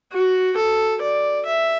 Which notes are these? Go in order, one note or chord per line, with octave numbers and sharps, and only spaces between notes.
F#4
A4
D5
E5